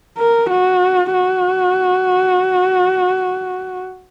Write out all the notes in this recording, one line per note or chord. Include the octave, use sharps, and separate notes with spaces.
A#4
F#4
F#4